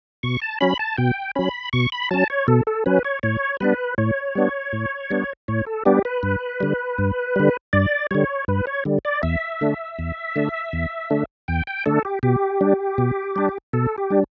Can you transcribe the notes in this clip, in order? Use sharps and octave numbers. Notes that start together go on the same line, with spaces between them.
B2 C#6
A5
F#3 C#4 B5
A5
B2 G5
F#3 C#4 B5
B2 C#6
B5
F#3 C#4 A5
C#5
B2 A4
A4
F#3 C#4 B4
C#5
A2 C#5
G3 B3 D4 B4
A2 C#5
G3 B3 D4
A2
G3 B3 D4
A2 C#5
A4
G3 B3 D4 G4
B4
G2
D3 G3
G2
D3 G3
G2 D5
D3 G3 C#5
G2 B4
C#5
D3 G3
D5
E2 E5
D3 A3 D4
E2
D3 A3 D4
E2
D3 A3 D4
E2 G5
G5
D3 A3 D4 A4
G4
B2 G4
G3 D4
B2
G3 D4
B2 A4
G4
G3 D4